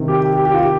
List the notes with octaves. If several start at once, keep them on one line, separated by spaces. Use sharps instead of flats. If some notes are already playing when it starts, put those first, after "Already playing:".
Already playing: C3 D#3
G4
G4
G4
G4
F4
G4